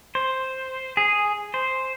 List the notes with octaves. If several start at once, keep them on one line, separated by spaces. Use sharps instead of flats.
C5
G#4
C5